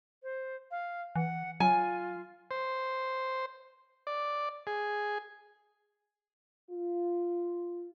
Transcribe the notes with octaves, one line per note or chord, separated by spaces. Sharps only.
C5
F5
E3 F#5
F#3 F4 G#5
C5
D5
G#4
F4